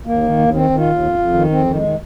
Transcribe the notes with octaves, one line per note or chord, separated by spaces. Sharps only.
D#2 A#3
D#3
D#2
D#3 C4
D#3
F4
D#2
F2
F2
D#3
F2 C4
D#3
G#3
D#3